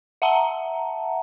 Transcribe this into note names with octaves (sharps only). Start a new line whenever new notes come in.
E5 F#5 A5 A#5